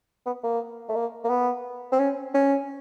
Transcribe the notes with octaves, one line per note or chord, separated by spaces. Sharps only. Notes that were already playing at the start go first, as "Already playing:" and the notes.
B3
A#3
A3
A#3
A#3
B3
C4
C#4
C#4